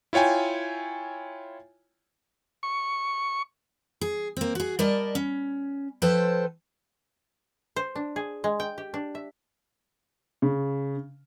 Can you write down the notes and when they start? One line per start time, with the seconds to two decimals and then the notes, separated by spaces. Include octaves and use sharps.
0.13 E4 F4 C#5 G5 G#5
2.63 C#6
4.01 G#4
4.37 A#3 C4
4.55 F#4 G#4
4.79 G3 A#4 D5 D#5 A5
5.15 C#4
6.02 F3 A4 B4 C5 G5 A5
7.76 C5
7.96 D4
8.16 G#4
8.44 G#3
8.60 G5
8.78 G4
8.94 D4
9.15 E5
10.42 C#3